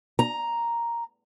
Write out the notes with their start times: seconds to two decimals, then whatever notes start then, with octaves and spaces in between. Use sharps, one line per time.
0.19 A#5